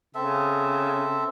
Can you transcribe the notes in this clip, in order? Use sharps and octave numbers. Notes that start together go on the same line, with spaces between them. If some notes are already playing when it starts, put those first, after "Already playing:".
C#3 C4 A4 E5